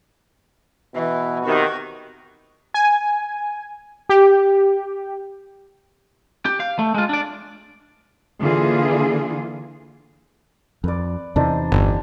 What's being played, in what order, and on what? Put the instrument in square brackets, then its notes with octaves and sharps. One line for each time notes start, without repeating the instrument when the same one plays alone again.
[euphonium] B2 [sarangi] E3
[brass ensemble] C3 D#3 [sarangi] F#4
[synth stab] G#5
G4
[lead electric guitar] G4
F5
A3
G#3 F4
D4 D5
[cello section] D3 E3 A#3 F4 G#4
[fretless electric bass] F2 [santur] B4 D5
[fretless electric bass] E2 C3 E3 [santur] D4 D#4 C5
[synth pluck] G1